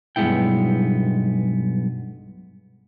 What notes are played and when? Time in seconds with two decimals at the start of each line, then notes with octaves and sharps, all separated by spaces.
0.16 B1 G2 G#3 B3 E4 G5